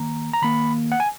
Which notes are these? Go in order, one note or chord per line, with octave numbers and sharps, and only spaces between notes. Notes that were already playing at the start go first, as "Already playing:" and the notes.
Already playing: D#3 A#3 A#5
A#5
D#3 A#3 B5
F#5
G#5